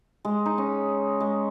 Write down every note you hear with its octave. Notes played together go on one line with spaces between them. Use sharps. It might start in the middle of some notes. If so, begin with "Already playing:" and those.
G#3
D#4
C#4
G#3